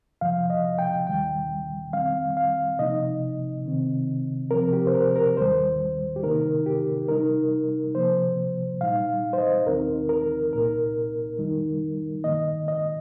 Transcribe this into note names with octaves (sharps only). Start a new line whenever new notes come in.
F2 C3 F3 F5
D#5
G5
D#2 D#3 G3 G5
F2 D#3 G3 C4 F5
F5
C3 F3 A#3 D#4 D#5
C3 D#3 C4
C3 F3 C4 A#4
G4
C5
A#4
A#4
D#2 D#3 G3 C5
G4
C3 D#3 A#3 D#4 A#4
G4
C3 G3 D#4 A#4
C3 F3 A#3 C5
A#2 G3 D#4 F5
C5
D#5
D#2 D#3 C4 D#4 A#4
A#4
C2 A#2 A#3 D#4 A#4
F2 D#3 G3 D#4
G2 D#3 A#3 D#5
D#5